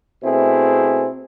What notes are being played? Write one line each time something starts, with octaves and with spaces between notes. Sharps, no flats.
B2 A3 C4 E4 G#4